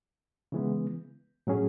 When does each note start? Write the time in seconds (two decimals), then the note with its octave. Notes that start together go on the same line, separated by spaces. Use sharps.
0.52 C#3 E3 G#3 B3
1.47 A2 F#3 C#4 G#4